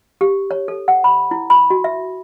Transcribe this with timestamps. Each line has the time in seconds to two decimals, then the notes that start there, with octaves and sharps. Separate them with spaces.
0.21 G4
0.51 C#5
0.68 A4
0.88 F#5
1.04 B5
1.31 E4
1.50 B5
1.70 F#4
1.84 E5